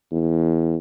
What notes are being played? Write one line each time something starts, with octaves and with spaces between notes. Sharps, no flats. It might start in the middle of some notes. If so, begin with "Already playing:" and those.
E2